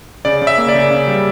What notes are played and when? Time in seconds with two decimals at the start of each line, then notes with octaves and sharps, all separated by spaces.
0.25 C#3 D5
0.42 C#3
0.47 E5
0.58 A#3
0.69 D5
0.74 C#3
0.91 C#3
1.08 G3